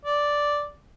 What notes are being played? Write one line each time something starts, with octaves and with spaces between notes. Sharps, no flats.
D5